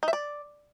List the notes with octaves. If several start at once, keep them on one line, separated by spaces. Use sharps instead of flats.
D#4
E5
D5